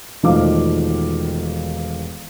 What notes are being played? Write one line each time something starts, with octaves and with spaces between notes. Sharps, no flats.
E1 D#3 F3 A3 F5 D6